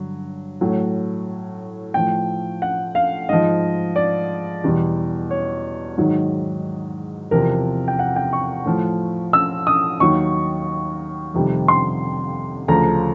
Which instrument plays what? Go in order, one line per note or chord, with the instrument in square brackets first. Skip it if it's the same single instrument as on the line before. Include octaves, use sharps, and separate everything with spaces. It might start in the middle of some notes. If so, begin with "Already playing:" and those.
Already playing: [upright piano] G2 D3 F#3
A2 F#3
A2 F3 G5
F#5
F5
G#2 F3 D#5
D5
E2 B2 G3
C#5
G#2 D#3 F#3
E2 C3 F3 A#4
G5
F#5
G5
C#6
A2 F3
E6
D#6
D#2 D#3 F#3 C#6
F2 C3 D#3 G3
C6
D2 C#3 F3 A#5